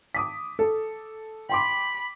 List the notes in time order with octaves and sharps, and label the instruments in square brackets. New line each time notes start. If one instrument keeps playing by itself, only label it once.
[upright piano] D6 D#6 B6
A4
[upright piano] G5 C6 D6 [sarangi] B5